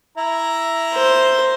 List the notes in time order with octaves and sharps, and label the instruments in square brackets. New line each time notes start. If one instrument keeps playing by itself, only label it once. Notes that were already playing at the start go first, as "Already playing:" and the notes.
[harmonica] E4 E5 A#5
[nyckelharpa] C5